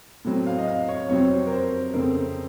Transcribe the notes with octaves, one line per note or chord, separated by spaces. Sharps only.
A2 F#3 C4
F5
D#5
F5
C#5
F2 C3 F#3 C4 C#5
A#4
C5
F2 C#3 A3 C4 A#4